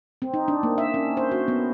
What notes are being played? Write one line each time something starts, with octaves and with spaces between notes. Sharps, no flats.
C4
D#4
D4
A#3
E5
C#4
C5
F#4
B3